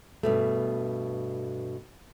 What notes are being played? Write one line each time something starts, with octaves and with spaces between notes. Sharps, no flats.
G2 B2 A3